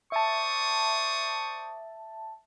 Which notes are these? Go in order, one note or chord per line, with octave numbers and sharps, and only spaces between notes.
C5 D5 E5 A5 C#6 D#6